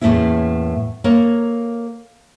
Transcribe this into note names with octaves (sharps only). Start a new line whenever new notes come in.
E2 A2 A3 A#3 C#4 E4
A#3 A4 A#4 C#5